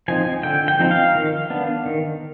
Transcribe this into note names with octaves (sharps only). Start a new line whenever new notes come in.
F3 C4 D#4 G#5
D3 G5
G5
F3 C4 D#4
F5
D#3
B3 D4
D#3